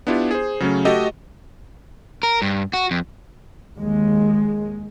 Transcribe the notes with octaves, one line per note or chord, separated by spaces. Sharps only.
B3 D4 E4 F4 G4
G#4 C5
C#3 F#3 A3 C#4
A3 F#4 G4 A4 D#5
A#4
G2
F#4
F2
D#2 G#3